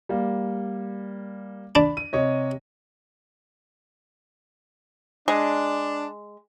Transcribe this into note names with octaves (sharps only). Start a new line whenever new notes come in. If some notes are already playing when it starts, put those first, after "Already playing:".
G3 A#3
D4 B5
D#7
C3 C#5 D#5
G#3 D4